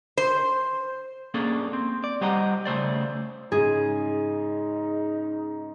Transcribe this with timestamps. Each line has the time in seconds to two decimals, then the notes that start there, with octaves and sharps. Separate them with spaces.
0.17 C5
1.34 A#3 C#4 D4 G#4 A4
1.73 C4
2.04 D5
2.21 G3 G4 C5 D#5 F#5 A#5
2.65 C#3 A3 C5 D5
3.52 G#2 C#3 D#4 G#4